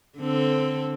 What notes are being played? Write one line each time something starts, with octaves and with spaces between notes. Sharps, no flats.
D3 C4 A4